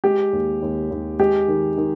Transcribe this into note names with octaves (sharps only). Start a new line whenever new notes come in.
G#3 G4
D#2
D#2
D#2
G#3 G4
D#3
D#3